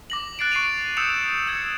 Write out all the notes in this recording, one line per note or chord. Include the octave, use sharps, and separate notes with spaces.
D6 A#6 F#7
F#6 A6 C7 D7
C#6 C7 D7 D#7 F7
D#6 E6 G6 C#7 E7 F7
E6 G#6 C#7